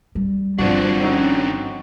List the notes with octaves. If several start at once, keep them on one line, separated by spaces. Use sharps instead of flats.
G3
G1 G2 D#3 F3 C4 D4 F#4
C4 C#4 D#4 F#4